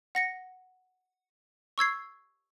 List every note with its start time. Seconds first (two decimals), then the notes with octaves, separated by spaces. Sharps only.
0.15 F#5 A#6 C#7
1.78 C#6 E6 G#6 C7